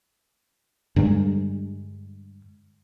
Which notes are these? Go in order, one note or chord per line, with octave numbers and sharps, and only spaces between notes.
G2 D3 G3 G#3